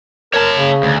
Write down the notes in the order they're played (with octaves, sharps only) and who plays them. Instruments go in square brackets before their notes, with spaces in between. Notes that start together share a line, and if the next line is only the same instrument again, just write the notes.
[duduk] A#4 [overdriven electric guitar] C#5 A5
[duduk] C#3
[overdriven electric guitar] D2